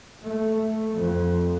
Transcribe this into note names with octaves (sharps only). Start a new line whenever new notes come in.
A3
F2